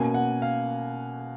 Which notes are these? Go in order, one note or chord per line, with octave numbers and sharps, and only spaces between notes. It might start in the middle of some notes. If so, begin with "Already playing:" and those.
Already playing: B2 A#3 C#4 G#5
F#5
F5